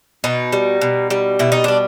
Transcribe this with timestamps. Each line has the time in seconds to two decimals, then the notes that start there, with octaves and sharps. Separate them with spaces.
0.24 B2 D#4
0.53 G3
0.81 B2
1.10 G3
1.39 B2 E4
1.52 D#4
1.64 G3 D4